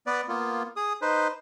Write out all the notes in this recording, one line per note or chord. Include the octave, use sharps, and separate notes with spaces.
B3 B4 D5
A#3 B3 F4
G#4 D#6
D#4 B4 C5